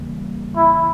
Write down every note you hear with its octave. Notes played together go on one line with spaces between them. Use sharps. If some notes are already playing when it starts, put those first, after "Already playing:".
Already playing: E2 C#3 E3 G3 A#3
C#3 E3 A#3 E4